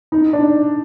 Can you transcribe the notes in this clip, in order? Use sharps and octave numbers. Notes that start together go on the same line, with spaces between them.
D#4
D4